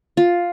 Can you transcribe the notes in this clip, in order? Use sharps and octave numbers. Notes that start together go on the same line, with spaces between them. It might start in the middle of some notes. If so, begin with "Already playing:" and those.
F4